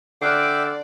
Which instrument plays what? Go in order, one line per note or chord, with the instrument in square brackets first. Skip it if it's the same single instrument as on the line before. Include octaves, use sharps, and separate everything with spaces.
[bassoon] D3 [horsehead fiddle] D5 [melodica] E5 G5 D6 [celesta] F6 F#6 C7